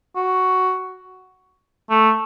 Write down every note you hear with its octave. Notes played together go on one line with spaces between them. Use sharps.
F#4
A3